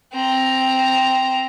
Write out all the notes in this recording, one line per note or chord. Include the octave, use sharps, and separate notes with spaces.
C4 A#5